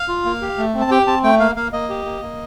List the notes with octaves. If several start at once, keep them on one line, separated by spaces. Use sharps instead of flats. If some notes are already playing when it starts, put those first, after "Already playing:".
Already playing: F5
F4
A#3
G4
A3
C4
A5
G4 G5
C4 A5
A3 G5
A#3 F5
A#3 F5
A#3 D#5
G4
A#3
A#3